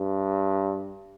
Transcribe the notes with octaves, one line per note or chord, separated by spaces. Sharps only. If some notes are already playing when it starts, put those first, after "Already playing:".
Already playing: G2